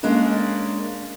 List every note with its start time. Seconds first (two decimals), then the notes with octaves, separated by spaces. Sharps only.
0.03 G#3 A#3 C#4 D4 A#4